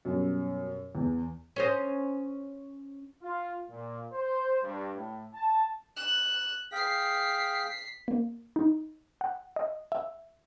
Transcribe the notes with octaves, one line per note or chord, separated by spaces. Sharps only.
F#2 B2 G3
E2
C#4 C5 D#5
F4
A#2
C5
G2
A2
A5
F#6 E7
G#4 F5 G5 B6 C7
A#3
D#4
F#5
D#5
E5